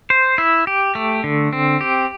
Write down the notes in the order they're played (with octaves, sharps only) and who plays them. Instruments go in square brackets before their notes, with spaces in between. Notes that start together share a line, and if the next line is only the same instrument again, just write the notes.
[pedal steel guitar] C5
E4
G4
A3
D3
C4
G4